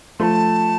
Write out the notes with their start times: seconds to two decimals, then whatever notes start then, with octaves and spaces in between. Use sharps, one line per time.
0.19 F3 A3 A5 C6